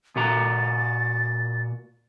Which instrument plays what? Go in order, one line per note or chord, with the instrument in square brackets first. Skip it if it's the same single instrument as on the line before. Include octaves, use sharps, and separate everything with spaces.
[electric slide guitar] A#2 F#4 A#5 [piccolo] A6